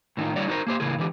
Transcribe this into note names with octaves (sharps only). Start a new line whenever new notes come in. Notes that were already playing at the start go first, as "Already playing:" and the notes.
A2 D#3 F#3 A#3 D#4 F4
D3 G3 E4 F#4 C#5 D5
D#4 F#4 A4 A#4 C5
A#3 G4 C5
A2 C#3 E3 A#3 G#4
D3 E3 G#3 G4